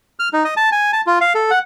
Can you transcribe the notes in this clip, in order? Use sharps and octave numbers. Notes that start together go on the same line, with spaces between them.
F6
D#4
D#5
A5
G#5
A5
F4
F5
A4
F#5